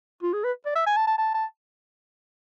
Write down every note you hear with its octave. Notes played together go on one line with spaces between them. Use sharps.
F4
G#4
B4
D5
E5
G#5
A5
A5
A5
A5